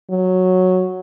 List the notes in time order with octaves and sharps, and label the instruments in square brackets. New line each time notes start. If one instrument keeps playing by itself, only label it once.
[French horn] F#3